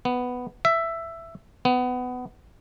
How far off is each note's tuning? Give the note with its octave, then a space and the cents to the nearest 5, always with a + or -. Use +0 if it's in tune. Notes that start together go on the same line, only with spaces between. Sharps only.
B3 +5
E5 +10
B3 +20